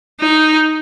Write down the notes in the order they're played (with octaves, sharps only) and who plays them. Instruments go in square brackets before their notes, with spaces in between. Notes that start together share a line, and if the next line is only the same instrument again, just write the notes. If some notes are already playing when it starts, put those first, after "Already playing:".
[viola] D#4